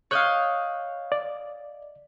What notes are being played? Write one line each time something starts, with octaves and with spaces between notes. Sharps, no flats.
C#5 D#5 F5 C#6 F#6 G6
D5